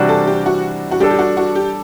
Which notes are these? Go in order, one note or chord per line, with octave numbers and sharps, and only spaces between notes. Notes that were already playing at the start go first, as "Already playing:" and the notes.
Already playing: C3 E3 G3 D4 F#4
A4
G4
F#4
F#4
G3 D4 G4 A4
G4
F#4
F#4
G4